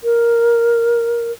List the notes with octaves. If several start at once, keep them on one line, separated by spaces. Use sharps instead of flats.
A#4